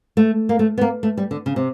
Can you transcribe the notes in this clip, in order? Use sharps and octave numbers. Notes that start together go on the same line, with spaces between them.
A3
A#3
A3
B3
A#3
A3
G3
D3
C#3
C3